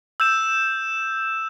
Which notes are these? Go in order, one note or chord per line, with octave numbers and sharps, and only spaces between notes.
E6 G6 E7